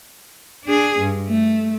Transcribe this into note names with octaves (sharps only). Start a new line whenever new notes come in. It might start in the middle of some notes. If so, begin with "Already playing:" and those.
D4 G#4
G2
A3